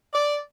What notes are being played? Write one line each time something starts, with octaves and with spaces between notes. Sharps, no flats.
D5